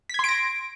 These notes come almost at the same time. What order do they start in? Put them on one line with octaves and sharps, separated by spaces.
B6 G#6 C6 D7 A#6